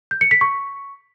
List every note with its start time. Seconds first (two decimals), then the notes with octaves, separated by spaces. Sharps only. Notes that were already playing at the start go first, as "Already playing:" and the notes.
0.11 G6
0.21 C#7
0.31 B6
0.41 C#6